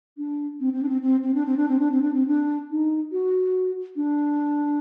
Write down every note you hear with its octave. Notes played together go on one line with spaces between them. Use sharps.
D4
C4
C4
D4
C4
C4
C4
D4
C4
D4
C4
D4
C4
D4
C4
D4
D#4
F#4
D4